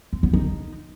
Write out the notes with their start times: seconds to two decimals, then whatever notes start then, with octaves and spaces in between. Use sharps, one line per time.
0.13 C4
0.23 B3
0.33 D#4